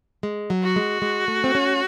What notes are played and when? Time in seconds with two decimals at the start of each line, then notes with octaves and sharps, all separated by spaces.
0.23 G#3
0.50 F#3
0.63 F#4
0.76 G#3
1.02 G#3
1.28 A3
1.44 C4
1.55 C#4